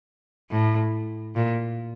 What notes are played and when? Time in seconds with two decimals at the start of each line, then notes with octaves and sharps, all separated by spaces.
0.51 A2
1.35 A#2